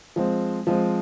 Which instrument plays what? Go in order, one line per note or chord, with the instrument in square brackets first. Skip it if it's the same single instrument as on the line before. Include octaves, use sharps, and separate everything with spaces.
[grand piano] F3 G#3 C4
F3 G#3 C4